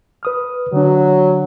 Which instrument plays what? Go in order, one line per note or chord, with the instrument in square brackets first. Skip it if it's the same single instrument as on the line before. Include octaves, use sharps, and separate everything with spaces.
[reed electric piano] B4 D#6 F6
[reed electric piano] D3 D4 [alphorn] F#3